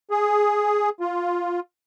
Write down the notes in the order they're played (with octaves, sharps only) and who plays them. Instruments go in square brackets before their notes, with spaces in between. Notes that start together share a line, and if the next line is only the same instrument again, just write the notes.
[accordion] G#4
F4